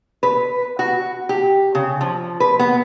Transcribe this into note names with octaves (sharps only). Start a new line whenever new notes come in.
B4
F#4
G4
C#3
F3
B4
B3